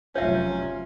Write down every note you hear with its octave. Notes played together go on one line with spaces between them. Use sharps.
F1 F#3 C#4 F4 C#5 E5 F5